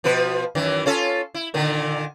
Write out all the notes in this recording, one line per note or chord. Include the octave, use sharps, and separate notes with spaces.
B2 F3 B4
F#2 D#3 E3
C#4 F4 A4
E4
A#2 D3 D#3